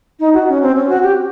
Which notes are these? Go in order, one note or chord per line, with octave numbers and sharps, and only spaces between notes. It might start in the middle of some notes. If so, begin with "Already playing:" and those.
D#4
F#4
C#4
C4
C#4
F#4
G4